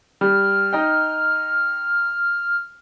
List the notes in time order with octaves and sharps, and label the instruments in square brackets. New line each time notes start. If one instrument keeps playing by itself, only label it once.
[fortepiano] G3 [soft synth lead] F6
[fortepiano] D#4 D#5 G5